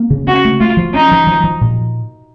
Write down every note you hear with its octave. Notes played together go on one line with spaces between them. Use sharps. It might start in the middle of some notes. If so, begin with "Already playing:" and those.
Already playing: A#3
C#3
C#4 F#4
A3
A3 F4
F3
C#4 D#4
F3
F3
F3
A#2